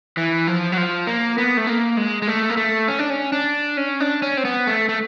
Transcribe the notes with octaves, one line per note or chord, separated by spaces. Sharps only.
E3
F3
F#3
F3
A#3
B3
A3
A#3
G#3
G#3
A3
A#3
A3
C#4
D4
C#4
D4
C#4
D4
C#4
C4
B3
A3
A3